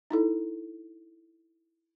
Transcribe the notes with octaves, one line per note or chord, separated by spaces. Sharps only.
D#4 E4 A4